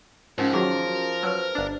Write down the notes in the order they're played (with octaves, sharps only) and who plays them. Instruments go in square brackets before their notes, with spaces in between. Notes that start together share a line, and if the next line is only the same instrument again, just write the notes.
[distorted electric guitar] G#2 [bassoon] F3 [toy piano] C#4 D#4 A#4
[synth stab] D#3 F#3 [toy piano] F#4 G#4 [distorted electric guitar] A#4
[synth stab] F#3 [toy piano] B4 C5 E6
[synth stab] G1 D4